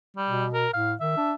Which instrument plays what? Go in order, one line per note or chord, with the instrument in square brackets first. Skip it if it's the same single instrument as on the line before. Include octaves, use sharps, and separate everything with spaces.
[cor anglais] G3
[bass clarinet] B2
[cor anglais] A#4
[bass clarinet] A2 [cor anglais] F5
[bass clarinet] D#3 [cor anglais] E5
[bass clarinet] D4